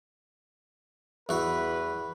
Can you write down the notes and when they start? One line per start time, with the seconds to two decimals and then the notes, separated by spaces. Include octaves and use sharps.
1.29 E2 F#4 B4